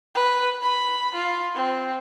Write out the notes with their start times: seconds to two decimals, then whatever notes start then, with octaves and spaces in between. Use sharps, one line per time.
0.15 B4
0.62 B5
1.15 F4
1.55 C4